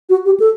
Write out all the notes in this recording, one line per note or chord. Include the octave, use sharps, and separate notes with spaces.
F#4
G4
A4